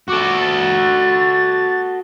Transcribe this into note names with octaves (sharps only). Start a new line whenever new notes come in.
F#4 A4 D6
A6